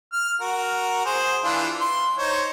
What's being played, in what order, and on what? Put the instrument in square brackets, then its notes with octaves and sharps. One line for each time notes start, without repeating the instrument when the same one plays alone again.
[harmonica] F6
F#4 A#4
G#4 C5
E3 D4 F4
C6
D#4 C5 C#5